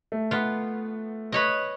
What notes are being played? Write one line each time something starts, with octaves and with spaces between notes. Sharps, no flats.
A3
B3 F4
B4 C#5 D#5